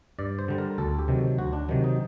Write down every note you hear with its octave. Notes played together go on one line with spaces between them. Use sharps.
G2 D5
C5
D3 G3
A#4
D2 A4
G4
C3 D#3 F#3
D2 F#4
D4
C3 D#3 F#3
D#4